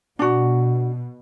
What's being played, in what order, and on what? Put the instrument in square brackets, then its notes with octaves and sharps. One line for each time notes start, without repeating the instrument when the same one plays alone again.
[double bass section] B2 [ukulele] D4 F#4